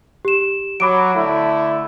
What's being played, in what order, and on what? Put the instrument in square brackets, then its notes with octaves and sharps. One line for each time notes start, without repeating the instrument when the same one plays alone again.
[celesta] G4 E7
[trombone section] F#3 [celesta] B5 D6 D7
[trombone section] D3 A3 E4